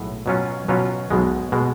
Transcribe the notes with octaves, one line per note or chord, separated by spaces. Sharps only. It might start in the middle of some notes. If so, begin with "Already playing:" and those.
Already playing: B1 A2 G#3 B3
B2 F#3 C#4 F4
B2 F#3 C#4 F4
B1 B2 G#3
B2 G#3